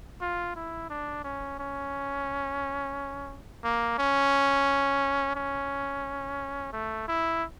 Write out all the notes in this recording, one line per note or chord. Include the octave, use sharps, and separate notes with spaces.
F4
E4
D4
C#4
C#4
A#3
C#4
C#4
A3
E4